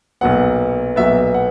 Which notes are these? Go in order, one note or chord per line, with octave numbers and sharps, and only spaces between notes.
B1 A#2 F#3 B3 F#5
B1 A#2 F#3 B3 E5
F#5